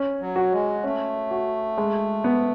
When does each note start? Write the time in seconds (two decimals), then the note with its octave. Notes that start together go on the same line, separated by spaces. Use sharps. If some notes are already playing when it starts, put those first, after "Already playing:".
Already playing: C#4
0.20 F#3
0.36 F#4
0.52 G#3
0.83 A3 C#4
1.31 F#4
1.78 G#3
2.24 B3